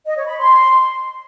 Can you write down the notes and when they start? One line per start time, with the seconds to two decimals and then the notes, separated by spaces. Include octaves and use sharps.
0.05 D#5
0.16 C#5
0.28 B5
0.39 C6